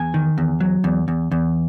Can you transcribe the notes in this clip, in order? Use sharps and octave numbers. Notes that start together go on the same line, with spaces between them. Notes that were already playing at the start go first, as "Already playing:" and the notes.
Already playing: E2 G#5
D#3
E2
F#3
E2
E2
E2